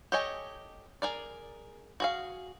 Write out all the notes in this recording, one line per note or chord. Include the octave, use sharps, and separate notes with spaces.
G4 A4 C#5 D#5 G#5
G#4 A#4 D5
F#4 G#4 F5